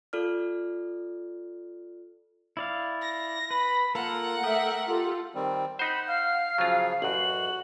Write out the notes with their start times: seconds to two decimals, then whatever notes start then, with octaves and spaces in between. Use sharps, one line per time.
0.13 F4 A4 D5 F6
2.57 E4 D5 F5
3.02 A#6
3.51 B4 B5
3.95 A#3 F4 A4 A#4 F#5
4.43 A3 E5 G5 D#6
4.85 F4 G4 A4
5.35 D#3 G3 C4
5.79 D#4 C5 F#5 B5
6.08 F5 F6
6.58 C#3 F3 F#3 F4
7.02 A1 F#2 F#4 F#7